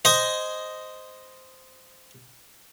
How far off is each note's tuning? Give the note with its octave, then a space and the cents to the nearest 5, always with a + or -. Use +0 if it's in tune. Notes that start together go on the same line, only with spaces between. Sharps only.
C5 -10 D#5 +0 G#5 +0